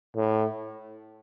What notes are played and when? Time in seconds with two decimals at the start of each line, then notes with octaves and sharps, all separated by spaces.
0.16 A2